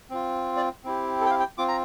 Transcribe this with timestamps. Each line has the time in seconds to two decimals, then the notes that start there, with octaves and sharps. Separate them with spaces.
0.10 C4 F4
0.57 D5
0.84 C4 E4 G4
1.21 A4
1.26 G5
1.30 F5
1.40 G5
1.58 C4 F4 D6
1.68 A#5